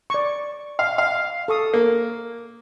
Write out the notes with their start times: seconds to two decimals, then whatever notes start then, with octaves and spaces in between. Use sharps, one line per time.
0.10 D5 C#6
0.79 F5
0.98 F5
1.48 A4 C#6 D#6
1.73 A#3 A4